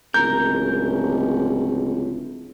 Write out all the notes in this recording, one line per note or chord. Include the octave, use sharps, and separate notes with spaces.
D1 C#2 A#4 G6